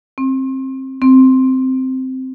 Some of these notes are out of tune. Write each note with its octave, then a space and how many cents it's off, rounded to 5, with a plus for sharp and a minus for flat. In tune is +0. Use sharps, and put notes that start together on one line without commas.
C4 +20
C4 -5